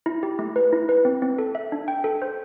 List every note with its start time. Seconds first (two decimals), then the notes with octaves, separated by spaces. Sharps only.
0.06 E4
0.23 G4
0.39 A3
0.56 B4
0.73 E4
0.89 B4
1.05 C4
1.22 C4
1.39 A4
1.55 E5
1.72 D4
1.88 G5
2.04 A4
2.22 C5